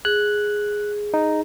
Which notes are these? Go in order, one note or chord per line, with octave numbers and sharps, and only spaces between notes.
G#4 F#6
D#4